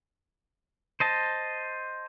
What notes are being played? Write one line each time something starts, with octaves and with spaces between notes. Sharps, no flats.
C5 D#5 A5